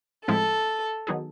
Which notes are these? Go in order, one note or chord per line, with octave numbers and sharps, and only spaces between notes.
A2 F3 G#3 C4 E4 A4
D#3 F#3 B3 D#4 G#4